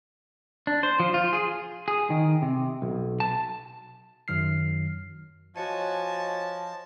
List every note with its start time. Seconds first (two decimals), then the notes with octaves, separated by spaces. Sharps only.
0.67 D4
0.83 C5
1.00 F3
1.14 F4
1.33 G#4
1.88 G#4
2.10 D#3
2.42 C3
2.82 B1
3.20 A5
4.28 F#2 D#3 F#3 F6 C7
5.56 F3 F#4 C#5 D#5 G#5 A5